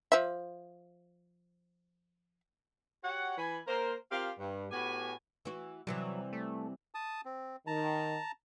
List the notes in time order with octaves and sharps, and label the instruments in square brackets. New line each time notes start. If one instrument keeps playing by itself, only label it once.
[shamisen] F3 E5
[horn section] F#4 G4 C#5 F#5
E3 G#5 B5
A#3 A#4 C5
C4 F4 G4 A#4 F5
G2
A2 B3 F#4 G4 G#5
[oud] E3 F#4
[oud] C3 E3 G3 [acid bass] F#3
[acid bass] A3
[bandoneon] A5 D#6
C4
[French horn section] D#3 [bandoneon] A5 A#5